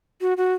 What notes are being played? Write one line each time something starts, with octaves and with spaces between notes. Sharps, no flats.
F#4
F#4